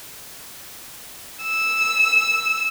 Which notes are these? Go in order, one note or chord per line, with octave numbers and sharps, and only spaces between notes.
E6